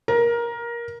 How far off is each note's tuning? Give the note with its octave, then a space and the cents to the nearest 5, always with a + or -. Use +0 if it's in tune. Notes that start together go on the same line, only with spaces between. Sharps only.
A#4 +15